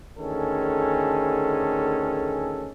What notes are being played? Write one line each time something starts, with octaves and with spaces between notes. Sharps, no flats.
D2 D#3 C#4 G#4 A4